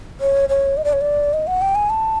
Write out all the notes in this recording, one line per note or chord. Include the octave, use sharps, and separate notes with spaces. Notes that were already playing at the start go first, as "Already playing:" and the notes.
C#5
C#5
D#5
D5
C#5
D5
D#5
F#5
G5
G#5
A5